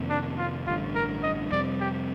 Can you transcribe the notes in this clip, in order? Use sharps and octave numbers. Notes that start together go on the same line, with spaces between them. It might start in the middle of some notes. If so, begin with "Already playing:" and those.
Already playing: F2 C3 D#3 A#3
D4
F4
A1 G2 D3 F4
A#4
D#5
F2 C3 G3 C4 D5
G4